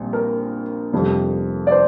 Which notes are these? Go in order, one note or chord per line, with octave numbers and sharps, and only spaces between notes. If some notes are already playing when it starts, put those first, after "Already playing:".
Already playing: A#1 A#2 G3 C4
A#4
F1 F2 C3 G3
D5
C5